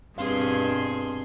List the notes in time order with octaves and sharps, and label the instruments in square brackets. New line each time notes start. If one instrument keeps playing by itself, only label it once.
[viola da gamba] G2 B2 [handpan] C4 F5 [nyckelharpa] G#4 C6